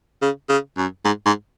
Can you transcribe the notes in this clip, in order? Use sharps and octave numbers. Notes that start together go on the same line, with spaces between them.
C#3
C#3
F#2
G#2
G#2